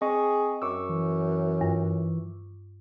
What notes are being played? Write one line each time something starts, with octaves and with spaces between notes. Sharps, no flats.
C4 G#4 D#5 C#6
F#2 C#6 D6 E6
E3
G2